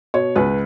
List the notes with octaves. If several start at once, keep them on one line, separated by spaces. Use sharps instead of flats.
B2 C#5
C#2 B4